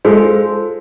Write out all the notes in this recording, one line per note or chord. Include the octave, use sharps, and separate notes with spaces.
G#3 F4 A4 C5